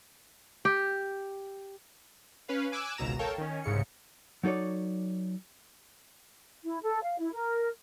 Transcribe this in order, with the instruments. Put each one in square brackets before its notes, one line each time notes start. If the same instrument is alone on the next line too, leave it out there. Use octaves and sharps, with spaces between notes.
[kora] G4
[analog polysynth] C#4 B4 F5
G#5 D6 E6 F#6
G#1 C#2 B2 A#5 E7
A4 A#4 C#5 F5 G5 A5
D#3 C#4
C2 G#2 C#3 C#7
[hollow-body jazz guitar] F#3 D#4 A4 C#5 D5
[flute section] E4
A4
F5
E4
A#4